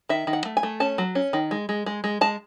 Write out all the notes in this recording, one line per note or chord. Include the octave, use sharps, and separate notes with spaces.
D#3 E5
D#3
F#5
A3
G#5
A3
C#4 A5
F#3
C#4
D#3
G#3
G#3
G#3
G#3
G#3 A5